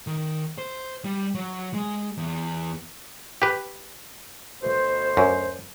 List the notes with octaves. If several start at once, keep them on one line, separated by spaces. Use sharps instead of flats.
D#3
C5
G3
F#3
G#3
E2
G4 B4
D2 B2 C5
F#2